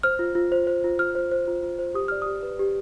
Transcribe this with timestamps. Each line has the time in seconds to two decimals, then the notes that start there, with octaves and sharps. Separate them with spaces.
0.03 C5 F6
0.19 F4
0.35 F4
0.52 C5
0.67 C5
0.84 F4
0.99 F4 F6
1.15 C5
1.31 C5
1.47 F4
1.63 F4
1.79 C5
1.94 G4 D#6
2.08 D5 F6
2.22 G4 D#6
2.43 B4
2.59 G4